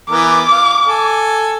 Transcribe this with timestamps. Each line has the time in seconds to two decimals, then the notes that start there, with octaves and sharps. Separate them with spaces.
0.10 E3 B3 A#4 D6
0.52 F5
0.87 A4 G#5